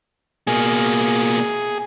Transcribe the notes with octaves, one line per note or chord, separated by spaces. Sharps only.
B2 A#3 G#4